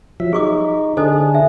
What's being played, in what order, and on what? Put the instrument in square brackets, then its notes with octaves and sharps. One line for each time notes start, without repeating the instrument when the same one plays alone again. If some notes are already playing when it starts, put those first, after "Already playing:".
[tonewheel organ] F3 F#3 E5
[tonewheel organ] D#4 [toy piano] G#4 C#6 D6
[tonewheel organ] D3 D4 G#4 [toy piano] A4 C5 D#5
[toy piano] E5